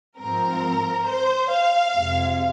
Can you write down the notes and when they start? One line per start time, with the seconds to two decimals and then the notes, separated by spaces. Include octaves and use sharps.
0.19 G#2 F3 C4 A#4
1.06 C5
1.51 F5
1.95 F2 C3 G#3